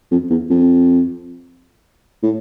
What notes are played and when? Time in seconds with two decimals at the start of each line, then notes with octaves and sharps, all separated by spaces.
0.11 F2
0.30 E2
0.50 F2
2.23 A2